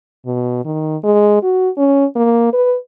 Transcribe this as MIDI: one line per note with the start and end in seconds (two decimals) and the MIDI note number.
0.26 0.64 47
0.65 0.97 51
1.04 1.38 56
1.43 1.69 66
1.77 2.05 61
2.16 2.49 58
2.53 2.76 71